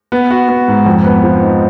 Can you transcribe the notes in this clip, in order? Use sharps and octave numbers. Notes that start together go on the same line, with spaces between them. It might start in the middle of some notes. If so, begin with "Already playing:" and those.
B3
F#4
B3
G#2
F2
B3
F3
D#4